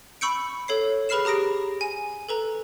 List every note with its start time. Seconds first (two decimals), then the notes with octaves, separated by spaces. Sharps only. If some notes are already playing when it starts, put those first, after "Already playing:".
0.21 B5 C#6 E6 G6 C#7 D7
0.68 A4 C#5 C7
1.09 G#4 B4 B5 F6 C7 E7
1.25 G4 A#5 D#6 A#6 D7
1.81 G#5
2.29 A4 B4 A#5